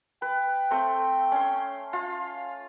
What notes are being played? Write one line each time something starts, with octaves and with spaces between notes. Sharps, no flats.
B4 G5
A3 C4
C#4 C6
F4 F5